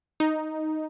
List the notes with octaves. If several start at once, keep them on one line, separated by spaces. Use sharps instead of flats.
D#4